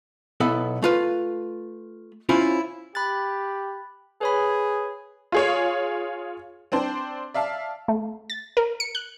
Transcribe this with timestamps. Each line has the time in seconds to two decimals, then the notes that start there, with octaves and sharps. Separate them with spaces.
0.40 B1 B3 E4 A4
0.82 A3 F4 B4
2.29 C#4 E4 F4 C5 C#5
2.95 G4 B5 F#6 A6
4.21 G#4 B4 C#5 B5
5.32 F4 G#4 C#5
6.72 C4 D4 C5 A5
7.34 D5 E5 F5 A5
7.88 A3
8.30 A6
8.57 A#4
8.80 C#7
8.95 F#6